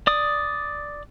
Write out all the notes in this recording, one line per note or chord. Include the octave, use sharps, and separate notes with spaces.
D5 D#6